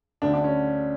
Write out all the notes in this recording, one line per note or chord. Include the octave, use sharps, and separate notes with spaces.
D2 D3 D4
D4
C#4